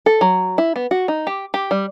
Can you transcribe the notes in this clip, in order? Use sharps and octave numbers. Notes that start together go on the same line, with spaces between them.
A4
F#3
E4
B3
F#4
D#4
G4
G4
G3